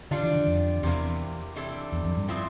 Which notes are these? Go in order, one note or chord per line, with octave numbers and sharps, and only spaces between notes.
D3 G3 D4 F4
E3
D3
F2
E2 C3 E3 A#3
C3 E3 G3 D4 A4
E2
F2
G2
A#2 F3 C4 E4